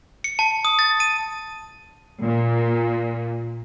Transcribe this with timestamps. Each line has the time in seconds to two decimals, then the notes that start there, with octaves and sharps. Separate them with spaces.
0.24 C#7
0.39 A5
0.65 D#6
0.79 A6
1.00 D#7
2.25 A#2